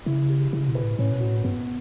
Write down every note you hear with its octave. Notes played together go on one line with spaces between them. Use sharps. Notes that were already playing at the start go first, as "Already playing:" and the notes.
C#3 E4
G4
C#3 E4
B2
B4
A2
A2 C#4
B2
A2 F#4
G2 B3